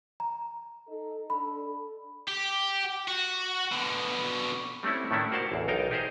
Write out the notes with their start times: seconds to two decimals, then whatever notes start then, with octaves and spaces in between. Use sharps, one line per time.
0.20 A#5
0.87 D#4 A4
1.30 D4 A4 B5
2.28 G4
3.08 F#4
3.72 B2 D3
4.83 G3 A3 C4 C#4 E4
5.11 A2 D#3 A3 C#4 D4 E4
5.31 A#3 F#4 A#4 C5 F#5 A5
5.52 A1 E2
5.68 B1 D#4 A#4 F5 G5
5.91 D#4 G4 G#4 A#4 C5 D#5